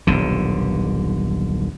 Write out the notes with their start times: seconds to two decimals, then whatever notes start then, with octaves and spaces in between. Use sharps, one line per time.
0.07 D#1 B1 D3